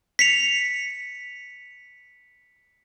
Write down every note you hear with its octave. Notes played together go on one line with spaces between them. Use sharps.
B6 C#7 F7